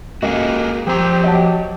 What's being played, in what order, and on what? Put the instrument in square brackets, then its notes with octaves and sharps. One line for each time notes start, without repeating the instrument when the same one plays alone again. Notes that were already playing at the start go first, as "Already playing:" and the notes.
[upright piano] C#2 D#5 [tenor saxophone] A#3 [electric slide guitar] F#4 G#4 A4
[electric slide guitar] F3 A#5 [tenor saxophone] C4 [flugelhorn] G4
[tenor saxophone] F#3 [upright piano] D#5 F#5 A5